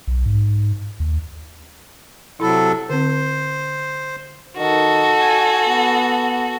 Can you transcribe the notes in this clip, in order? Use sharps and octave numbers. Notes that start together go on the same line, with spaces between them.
B1
G#2
D#2
C3 F#3 E4 A4 B5
D3 C4 C5
D#3 F#4 A4
G#5
B3